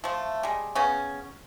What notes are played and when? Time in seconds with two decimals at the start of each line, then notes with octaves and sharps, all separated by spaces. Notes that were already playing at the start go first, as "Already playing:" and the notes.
0.04 F3 A3
0.43 G3 G#3
0.75 C#3 B3 C#4